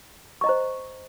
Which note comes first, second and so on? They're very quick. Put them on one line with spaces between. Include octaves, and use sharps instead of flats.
C#6 D#5 A#5 C5